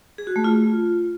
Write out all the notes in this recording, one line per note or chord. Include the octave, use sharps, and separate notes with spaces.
G#4
F#4
A3
F4